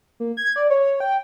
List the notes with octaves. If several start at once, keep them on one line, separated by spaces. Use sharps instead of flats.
A#3
G#6
D5
C#5
G5